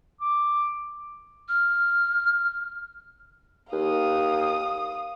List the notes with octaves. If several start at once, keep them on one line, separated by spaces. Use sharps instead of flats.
D6
F6
D#2 F5 D#6